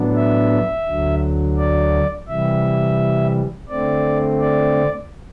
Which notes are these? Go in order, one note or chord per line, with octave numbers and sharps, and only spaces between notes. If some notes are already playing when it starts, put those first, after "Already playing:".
Already playing: A2 F#3 B3 D4
E5
D2 D3 F#3
D5
C3 E3 G3 E5
D3 A3 C4 D5
D5